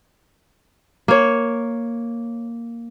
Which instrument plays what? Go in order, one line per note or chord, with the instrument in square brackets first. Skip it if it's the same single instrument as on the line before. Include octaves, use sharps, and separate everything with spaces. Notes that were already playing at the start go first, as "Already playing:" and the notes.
[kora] A#3 C#5